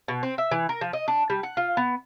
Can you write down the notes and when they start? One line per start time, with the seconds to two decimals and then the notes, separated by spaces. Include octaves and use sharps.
0.08 B2
0.23 C4
0.38 E5
0.51 E3
0.69 A#4
0.81 F3
0.93 D#5
1.08 D4
1.30 G3
1.43 F#5
1.57 F4
1.77 B3